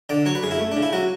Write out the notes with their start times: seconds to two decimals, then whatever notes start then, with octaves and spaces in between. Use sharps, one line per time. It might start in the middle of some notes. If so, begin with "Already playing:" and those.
0.09 D3 D5
0.25 F#3 C#5
0.35 B4
0.43 F#2 G#4
0.51 E4
0.59 A3
0.72 D4
0.77 C#3
0.82 E4
0.93 F#3 F#4